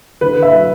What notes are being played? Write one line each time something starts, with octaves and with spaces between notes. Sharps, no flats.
D3 B4
E5
F#3